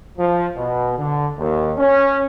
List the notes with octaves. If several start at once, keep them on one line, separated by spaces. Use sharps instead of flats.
F3
B2
D3
D#2
C#4